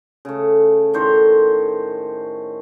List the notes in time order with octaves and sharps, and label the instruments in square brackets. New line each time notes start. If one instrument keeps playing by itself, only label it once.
[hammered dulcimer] C#3 A3
A2 D#3 C5 C#5